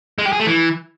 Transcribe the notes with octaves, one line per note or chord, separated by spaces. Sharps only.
G#3
G4
G#4
A3
E3